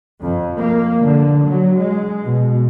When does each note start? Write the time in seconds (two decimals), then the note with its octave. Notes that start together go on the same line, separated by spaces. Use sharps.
0.22 F2
0.58 A#3
1.06 D3
1.44 F#3
1.79 G#3
2.23 B2